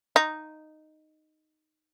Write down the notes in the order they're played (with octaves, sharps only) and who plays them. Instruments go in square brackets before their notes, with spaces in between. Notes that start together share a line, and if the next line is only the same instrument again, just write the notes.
[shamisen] D#4